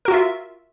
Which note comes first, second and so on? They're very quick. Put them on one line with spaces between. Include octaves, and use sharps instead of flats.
A#4 F#4 F4 E5